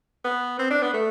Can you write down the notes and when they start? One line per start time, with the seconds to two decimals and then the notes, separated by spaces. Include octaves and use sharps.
0.24 B3
0.59 C4
0.70 D4
0.82 B3
0.94 A3